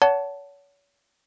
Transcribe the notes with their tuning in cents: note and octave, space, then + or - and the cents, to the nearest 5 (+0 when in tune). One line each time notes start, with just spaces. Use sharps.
C#5 +35 F#5 +10 A5 +0